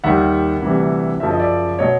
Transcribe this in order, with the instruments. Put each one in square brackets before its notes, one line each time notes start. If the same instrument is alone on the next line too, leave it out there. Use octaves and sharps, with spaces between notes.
[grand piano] D#2 D#3 G3 E5 F#5
D2 C3 E3 G3
F#2 C#3 F3 E5
D#5
D5 E5
B2 F#3 C#5 D#5